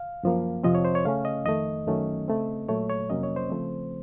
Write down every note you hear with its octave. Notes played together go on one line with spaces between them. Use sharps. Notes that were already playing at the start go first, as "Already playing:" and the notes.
Already playing: F5
F#2 F3 A#3
F2 C3 F3 C4 D#5
C#5
C5
C#5
C#3 A3 C#4 F5
D#5
F2 D#3 A3 D#5
F#2 D#3 F#3 A3 C#4
C#3 A3 C4
A#2 F#3 A3 C#5
C#5
F2 C3 F#3 A#3 C#4 D#5
C#5
C5
C#3 F3 A3 C4